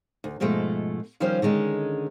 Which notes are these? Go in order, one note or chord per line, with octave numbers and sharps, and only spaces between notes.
D2
G#2 B2 F3 G#3 A3
D#3 F3 G3 C#4 F4 C5
D3 D#3 G#3 C#4